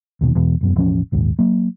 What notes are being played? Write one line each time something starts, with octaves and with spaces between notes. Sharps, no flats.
D#2 B2 D#3
E2 B2
E1 F#2 B3
E1 A1 F3 C#4
A#1 D#2 G#2
F#3 A#3